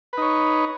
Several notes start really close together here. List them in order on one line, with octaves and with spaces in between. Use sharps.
B4 D#4 C#5